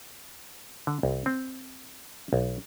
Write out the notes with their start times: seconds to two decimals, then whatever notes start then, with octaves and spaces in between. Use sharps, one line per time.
0.87 D3
1.03 C2
1.26 C4
2.33 B1